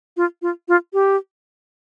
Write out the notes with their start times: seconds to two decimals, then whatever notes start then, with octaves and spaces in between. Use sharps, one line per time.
0.17 F4
0.42 F4
0.68 F4
0.93 G4